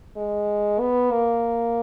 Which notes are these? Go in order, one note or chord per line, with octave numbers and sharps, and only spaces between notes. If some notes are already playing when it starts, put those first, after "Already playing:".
G#3
B3
A#3